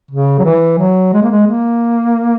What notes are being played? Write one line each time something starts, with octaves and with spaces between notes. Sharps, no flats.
C#3
F#3
E3
F#3
G#3
A#3
G#3
A#3